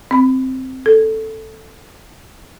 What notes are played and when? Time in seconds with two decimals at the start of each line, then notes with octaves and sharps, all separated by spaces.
0.11 C4 B5
0.86 A4